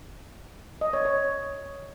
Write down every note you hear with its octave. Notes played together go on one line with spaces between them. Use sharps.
D#5
C#5
C#5